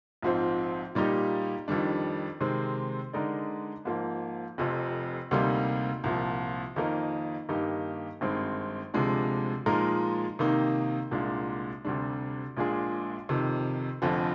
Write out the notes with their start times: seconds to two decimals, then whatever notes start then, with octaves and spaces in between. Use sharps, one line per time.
0.22 A#1 G#2 F3 C4
0.95 A#2 G3 A#3 D#4 G4
1.68 F2 D#3 G3 D4
2.41 C3 D#3 G#3 C4
3.13 D3 G#3 D#4 A#4 D5
3.85 G#2 F3 A#3
4.58 F1 F2 C3
5.31 D2 C3 G3 A#3 D#4
6.04 C2 A#2 F3
6.76 F2 D#3 A#3 D#4 A#4
7.49 G2 D#3 A#3 D#4 G4
8.21 G#1 G2 D#3 G#3 C4
8.94 D2 C3 F3 G#3 D4
9.66 A#2 F3 G#3 D#4 A#4
10.39 C3 D#3 A#3 D#4
11.11 C2 A#2 G#3 D4
11.85 D2 C3 G3 D4
12.57 A#1 A#2 G#3 D4 G#4
13.29 F2 C3 D#3
14.02 F1 F2 D3 F3